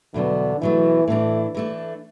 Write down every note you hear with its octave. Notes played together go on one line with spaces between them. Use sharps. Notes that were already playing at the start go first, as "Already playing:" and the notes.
E2 B2 D3 F#3 B3
B2 E3 F#3 A3
A2 E3 A3 D4
E3 A3 D4